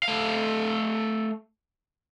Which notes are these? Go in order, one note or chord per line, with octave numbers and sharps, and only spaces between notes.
A3 F5